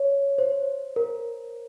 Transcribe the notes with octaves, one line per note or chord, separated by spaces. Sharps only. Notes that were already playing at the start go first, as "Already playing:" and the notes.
Already playing: C#5
C5
A#4